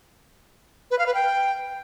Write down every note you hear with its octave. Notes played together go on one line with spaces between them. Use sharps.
B4
F5
B4
G5